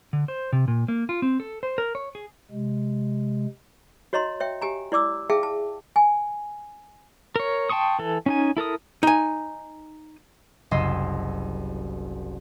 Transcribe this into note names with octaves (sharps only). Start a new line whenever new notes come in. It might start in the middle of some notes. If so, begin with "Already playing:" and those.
D3
C5
C3
A#2
A#3
F4
C4
A4
C5
A#4
C#5
G#4
C3 G#3
F#4 C#5 D#5 A#5 C6
C#5 E5 G5
G4 G#5 A#5
E4 D5 D6 E6
G#4 E5 F5 G5 A5
A5
G#5
A#4 C#5
G5 A5 C6 C#6 D#6
E3 A4
C#4 D#4 G#5
E4 A4 A#4 D#6
D#4 G#5
F#1 C2 D#5 C6 E6